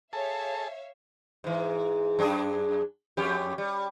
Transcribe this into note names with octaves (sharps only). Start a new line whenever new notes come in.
G#4 A4 C#5 E5 F5 A5
G#2 E3
F#2 D4 G#4
F2 C#4 G4
G3